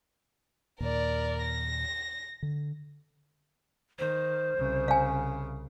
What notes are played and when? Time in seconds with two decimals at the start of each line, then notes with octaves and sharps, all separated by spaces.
0.80 D#2 A#2 A#4 D5
1.43 A#6
2.42 D3
3.99 D#3 C5
4.57 C2 C#3
4.88 F5 G#5